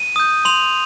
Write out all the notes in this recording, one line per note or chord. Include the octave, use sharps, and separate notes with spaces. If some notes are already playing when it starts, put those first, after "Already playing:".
Already playing: D#7
D#6 G6
C6 F7